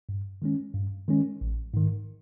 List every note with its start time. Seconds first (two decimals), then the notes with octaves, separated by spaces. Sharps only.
0.09 G2
0.42 D#3 G#3 C#4
0.74 G2
1.08 D#3 G#3 C#4
1.41 A1
1.74 G#2 D#3